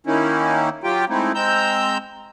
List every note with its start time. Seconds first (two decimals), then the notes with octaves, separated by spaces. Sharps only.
0.06 D#3 A#3 C#4 D#4 E4
0.84 F#3 F4 G4 G5
1.09 G#3 A3 C4 D#4 E4
1.35 G#3 C4 A#5 E6 G6